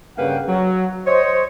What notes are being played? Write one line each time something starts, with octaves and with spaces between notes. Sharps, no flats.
G2 C#3 A#3 B4 F#5 G5
F#3
C5 C#5 D#5